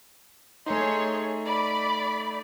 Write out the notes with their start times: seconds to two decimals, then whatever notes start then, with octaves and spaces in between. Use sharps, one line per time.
0.66 A3 D#4 G#4 C#5 C6
1.46 D5 B5